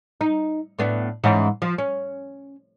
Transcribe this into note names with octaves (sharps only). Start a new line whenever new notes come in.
D#4
A2 B3 D4
G#2 E3 C#4
F3
C#4